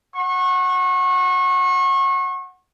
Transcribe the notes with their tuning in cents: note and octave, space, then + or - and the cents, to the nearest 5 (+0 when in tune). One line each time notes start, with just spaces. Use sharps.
F#5 +0 C#6 -30